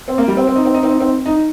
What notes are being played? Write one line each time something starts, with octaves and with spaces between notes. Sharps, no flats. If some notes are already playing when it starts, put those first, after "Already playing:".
C4
A#3
G3
C4
C4
D#4
C4
D#4
C4
D#4
C4
D#4